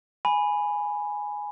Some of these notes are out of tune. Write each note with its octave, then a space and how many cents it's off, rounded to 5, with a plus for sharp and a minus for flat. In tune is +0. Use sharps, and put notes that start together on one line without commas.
G#5 +0 B5 +0